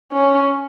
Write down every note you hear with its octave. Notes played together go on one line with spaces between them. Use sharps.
C#4